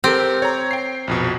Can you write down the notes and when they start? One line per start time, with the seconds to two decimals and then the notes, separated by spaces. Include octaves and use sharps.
0.04 C4 G4 A4 A#4
0.42 C#5 A#5
0.71 G5 C7
1.08 A#1 F2 B2